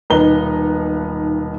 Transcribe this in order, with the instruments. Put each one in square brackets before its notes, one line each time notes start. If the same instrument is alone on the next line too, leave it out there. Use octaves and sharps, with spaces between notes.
[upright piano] D#1 B1 D#4 B4 A#5 G7